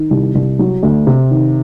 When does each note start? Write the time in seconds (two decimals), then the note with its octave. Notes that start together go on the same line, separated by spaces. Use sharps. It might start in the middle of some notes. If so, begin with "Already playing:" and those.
Already playing: D#3
0.10 C2
0.35 C2
0.59 F#3
0.83 D2
1.07 C3
1.31 D#3